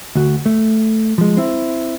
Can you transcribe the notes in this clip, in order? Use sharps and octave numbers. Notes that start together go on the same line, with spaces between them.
D2 F#4
A3
F3 G#3
C4 E4